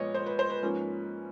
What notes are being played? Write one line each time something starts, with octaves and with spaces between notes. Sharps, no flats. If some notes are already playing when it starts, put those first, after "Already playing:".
Already playing: A#2 F3 G#3 B3 C#5 D#5
C5
B4
C5
B4
G#2 F3 A#3 C#4